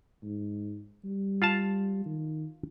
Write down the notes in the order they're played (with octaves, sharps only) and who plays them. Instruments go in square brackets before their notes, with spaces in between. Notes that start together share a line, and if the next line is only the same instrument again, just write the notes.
[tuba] G#2
G3
[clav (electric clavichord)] F4 F5 A5
[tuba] D#3